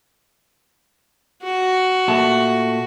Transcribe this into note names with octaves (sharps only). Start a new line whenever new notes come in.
F#4
A#2 A3 A5